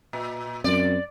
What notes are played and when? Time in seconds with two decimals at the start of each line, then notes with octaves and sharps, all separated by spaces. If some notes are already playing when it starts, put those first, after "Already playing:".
0.13 A#2
0.64 F#2 C4 D5